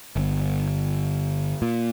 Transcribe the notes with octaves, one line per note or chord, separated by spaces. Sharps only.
G1
A#2